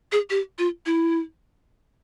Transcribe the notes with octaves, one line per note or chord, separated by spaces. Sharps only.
G#4
G4
F4
E4